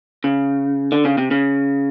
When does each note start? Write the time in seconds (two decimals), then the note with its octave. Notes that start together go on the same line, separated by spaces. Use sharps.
0.24 C#3
0.92 D3
1.05 C#3
1.18 C3
1.31 C#3